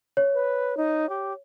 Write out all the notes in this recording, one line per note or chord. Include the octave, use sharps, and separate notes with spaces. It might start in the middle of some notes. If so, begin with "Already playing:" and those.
C#5
B4
D#4
G4